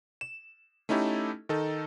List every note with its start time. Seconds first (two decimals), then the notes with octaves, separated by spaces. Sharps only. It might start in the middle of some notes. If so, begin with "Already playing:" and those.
0.21 E7
0.89 A3 C#4 D#4 E4 G4 A4
1.49 D#3 D#4 A4